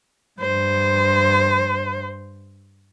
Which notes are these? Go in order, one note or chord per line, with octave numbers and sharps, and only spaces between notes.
G2 C5